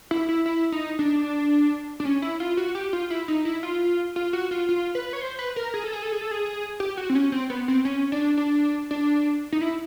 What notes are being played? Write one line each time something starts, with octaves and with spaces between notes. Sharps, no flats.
E4
E4
E4
D#4
D4
D4
C#4
E4
F4
F#4
G4
F4
E4
D#4
E4
F4
F4
F#4
F4
F4
B4
C#5
C5
B4
A#4
G#4
A4
G#4
A4
G#4
A4
G#4
G4
F#4
C4
C#4
C4
B3
C4
C#4
D4
D4
D4
D#4
E4